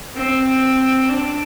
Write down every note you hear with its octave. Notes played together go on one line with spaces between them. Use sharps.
C4
D4